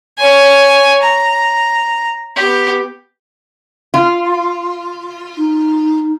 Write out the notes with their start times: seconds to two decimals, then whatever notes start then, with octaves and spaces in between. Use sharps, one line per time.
0.18 C#5 G#5
1.02 A#5
2.36 B3 G4
3.94 F4
5.37 D#4